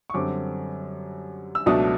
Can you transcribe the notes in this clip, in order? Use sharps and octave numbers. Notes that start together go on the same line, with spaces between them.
C#6
F#2 D3 G3 C4 D6
E6
C#2 B2 F#3 A3 D4 D#6